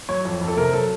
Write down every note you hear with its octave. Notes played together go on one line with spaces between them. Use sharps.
F#3 C#5
F2
F2
A4
C3 A#4
F#3 A4